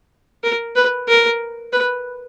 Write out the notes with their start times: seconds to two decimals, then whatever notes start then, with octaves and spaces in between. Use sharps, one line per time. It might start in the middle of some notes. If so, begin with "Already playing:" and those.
0.44 A#4
0.76 B4
1.08 A#4
1.73 B4